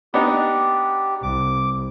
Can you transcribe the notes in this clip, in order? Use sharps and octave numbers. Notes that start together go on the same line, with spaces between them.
B3 D4 D#4 G4
C2 D6